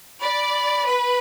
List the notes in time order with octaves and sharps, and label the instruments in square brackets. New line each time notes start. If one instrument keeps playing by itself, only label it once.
[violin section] D5 [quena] B5
[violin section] B4